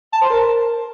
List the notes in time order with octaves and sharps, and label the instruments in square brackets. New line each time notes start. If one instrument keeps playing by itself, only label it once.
[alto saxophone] A5
C5
A#4